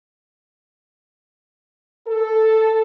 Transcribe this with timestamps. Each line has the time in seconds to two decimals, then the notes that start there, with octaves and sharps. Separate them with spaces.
2.08 A4